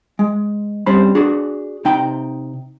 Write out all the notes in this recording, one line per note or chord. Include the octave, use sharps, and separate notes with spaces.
G#3
G2 G3 C4 C#4 C5 B5
D4 F#4 G#4
C3 D#4 G5